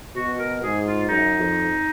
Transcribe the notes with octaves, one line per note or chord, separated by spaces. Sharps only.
B2 F#4
A#4
G#2 G#4
F4
F#2 D#4
F2